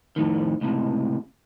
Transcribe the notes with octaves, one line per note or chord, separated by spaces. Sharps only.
F2 A2 D#3
C#2 A2 C3